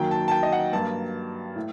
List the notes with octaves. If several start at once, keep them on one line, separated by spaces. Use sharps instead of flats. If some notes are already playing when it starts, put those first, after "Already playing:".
Already playing: F#2 D#3 F#3 A#3 G5
A5
A5
G5
D#5
F#5
G2 F#3 A#3 A5
A2